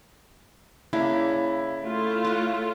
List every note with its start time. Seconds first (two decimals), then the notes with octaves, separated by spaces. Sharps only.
0.93 C#3 A#3 D4 E4
1.84 A3 F4
2.25 A#4 F#5